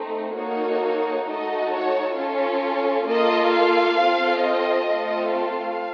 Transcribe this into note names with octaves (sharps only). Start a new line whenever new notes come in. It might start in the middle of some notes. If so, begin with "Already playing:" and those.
Already playing: A3 C4 D#4
A#3 D#4 F#4 A4 C#5
A3 D#4 F#4 A4 D#5
C#5
C#4 F4 A4 C#5
A#3 F4 A4 D#5
F5
C4 F4 A4
D#5
A3 C4 F4 A4
F5